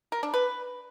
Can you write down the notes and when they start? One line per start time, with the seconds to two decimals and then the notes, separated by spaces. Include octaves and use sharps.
0.12 A#4
0.23 D4
0.34 B4